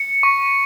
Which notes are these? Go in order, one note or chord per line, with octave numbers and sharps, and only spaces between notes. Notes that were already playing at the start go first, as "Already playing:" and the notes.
Already playing: C#7
C#6